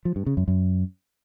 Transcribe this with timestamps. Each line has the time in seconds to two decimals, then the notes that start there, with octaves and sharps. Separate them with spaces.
0.05 F3
0.16 G2
0.26 C#3
0.37 F#2
0.48 F#2